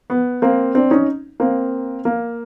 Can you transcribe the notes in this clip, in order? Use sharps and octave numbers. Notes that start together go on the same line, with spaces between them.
B3
A#3 C4
C4 D4
C#4 D#4
A#3 C4
A#3